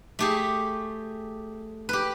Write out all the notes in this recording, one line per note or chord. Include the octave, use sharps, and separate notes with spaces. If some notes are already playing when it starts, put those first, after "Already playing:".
A3 G4 G#4
G4 B4